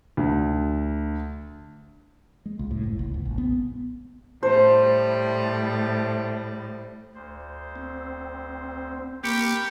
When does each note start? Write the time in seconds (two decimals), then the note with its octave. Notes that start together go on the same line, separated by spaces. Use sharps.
0.17 D2
2.46 G#3
2.59 C#2
2.71 A2
2.84 F#1
2.99 C#2
3.14 F#1
3.25 A#1
3.38 B3
4.43 A2 G3 C5
7.15 D2 C5
7.76 C4
9.24 A#3 G4 A#4 B5 C#6 G6 C#7 D7